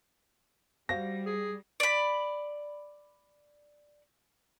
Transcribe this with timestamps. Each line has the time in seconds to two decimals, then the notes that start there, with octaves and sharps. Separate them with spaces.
0.89 G3 F#4 C5 F5 A#6
1.26 G#4
1.80 D5 B5